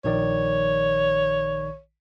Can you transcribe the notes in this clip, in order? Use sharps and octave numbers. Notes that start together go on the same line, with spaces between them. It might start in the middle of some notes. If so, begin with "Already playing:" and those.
A#1 D#3 C#5 D5